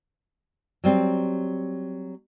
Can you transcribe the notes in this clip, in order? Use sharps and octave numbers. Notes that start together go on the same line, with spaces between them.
F#3 G3 C4